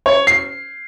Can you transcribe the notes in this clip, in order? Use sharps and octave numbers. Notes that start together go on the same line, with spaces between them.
C#5
C7